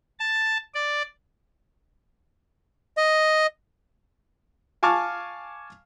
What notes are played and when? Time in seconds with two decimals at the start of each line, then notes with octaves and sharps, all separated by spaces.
0.19 A5
0.74 D5
2.97 D#5
4.83 F5 G#5 A5 C#6 D6 F6